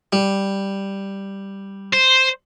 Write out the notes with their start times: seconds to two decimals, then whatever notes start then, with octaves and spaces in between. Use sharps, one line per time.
0.13 G3
1.93 C5